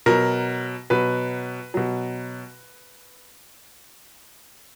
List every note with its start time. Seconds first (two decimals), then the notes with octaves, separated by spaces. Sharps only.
0.06 B2 F#3 A#4
0.90 B2 F#3 B4
1.74 B2 F#3